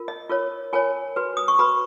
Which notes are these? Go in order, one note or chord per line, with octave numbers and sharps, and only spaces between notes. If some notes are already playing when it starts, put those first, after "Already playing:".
Already playing: F4 A#4
D#5
F4 A#4 C#5
F4 A#4 C#5 G#5
F#4 B4
D#6
C#6
F#4 B4 B5